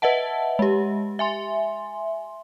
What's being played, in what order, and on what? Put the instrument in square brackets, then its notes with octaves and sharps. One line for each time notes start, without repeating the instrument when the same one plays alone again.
[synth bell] B4 D#5 E5 F#5 A5
G#3 G4
E5 G#5 C6